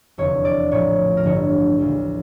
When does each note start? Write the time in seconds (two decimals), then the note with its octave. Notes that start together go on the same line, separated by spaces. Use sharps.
0.18 F1 E2 D3 F3 C#5
0.45 D5
0.71 A#1 A2 F3 C#5
1.17 A#4
1.24 A1 G2 D3 F3 C#5
1.79 D2 C#3 F3